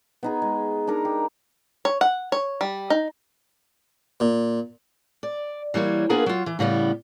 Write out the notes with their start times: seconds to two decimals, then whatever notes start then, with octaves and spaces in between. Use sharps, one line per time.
0.23 B3 D#4 G#4
0.42 G#3
0.87 D4 D#4 A#4
1.05 G4
1.85 C#5
2.01 F#5
2.32 C#5
2.61 G3
2.90 D#4
4.20 A#2
5.23 D5
5.74 E3 G3 A#3 C#5
6.10 A#3 B3 D4 F4 G#4 A#4
6.26 F#3 F4
6.46 E3
6.59 A2 C#3 G3 B3